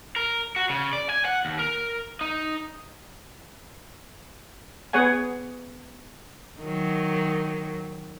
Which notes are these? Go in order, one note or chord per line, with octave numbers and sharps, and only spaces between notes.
A#4
F#4
C#3
D5
G#5
F#5
D#2
A#4
D#4
B3 G#4 C#5 F#5 G#5
D#3 F#3